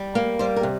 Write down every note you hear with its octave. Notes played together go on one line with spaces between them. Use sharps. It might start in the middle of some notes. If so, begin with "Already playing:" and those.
Already playing: G3
A#3
G3 C5
A#4
C3